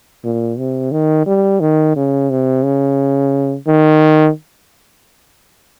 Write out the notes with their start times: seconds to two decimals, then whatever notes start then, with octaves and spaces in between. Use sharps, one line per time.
0.24 A#2
0.58 C3
0.92 D#3
1.27 G3
1.60 D#3
1.96 C#3
2.30 C3
2.64 C#3
3.67 D#3